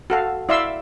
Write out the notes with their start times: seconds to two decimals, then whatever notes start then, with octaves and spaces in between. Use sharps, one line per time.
0.10 F#4 A4 F5
0.49 E4 D5 E5 F5 C6 E6